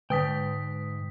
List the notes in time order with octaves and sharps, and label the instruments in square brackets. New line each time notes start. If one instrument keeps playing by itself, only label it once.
[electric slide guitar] G#2 G5 [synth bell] D3 D#6 B6